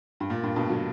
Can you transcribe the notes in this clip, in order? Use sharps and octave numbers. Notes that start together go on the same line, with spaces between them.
G2
A#2
G2
G2 B2
D3 F#3